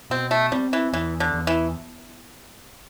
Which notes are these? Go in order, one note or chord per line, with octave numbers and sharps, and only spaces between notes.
B2 C4
A3
G3 C4
E3
E2 E3
D3
E2
E3